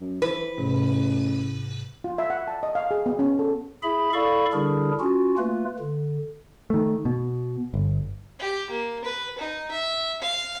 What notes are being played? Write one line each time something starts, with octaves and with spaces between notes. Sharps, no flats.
F#2
E3 B4 C5
A1 G#2 C3
F4
E5
F#5
A5
D#5
F5
G#4
B3
C#4
A4
E4 G#4 E5 B5
E4 A4 D5 F5 B5 C#6
D3 G3 D4 E4 G#4 A#4
C#4 F4 F#4
A3 A#3 F4 B4
D3
D#3 A3
B2
G1
G4
A#3
B4
D#4
E5
F5